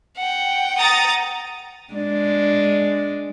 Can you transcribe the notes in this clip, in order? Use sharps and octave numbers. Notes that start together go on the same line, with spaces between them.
F#5 G5
A#5 D#6 A6
G#3 D4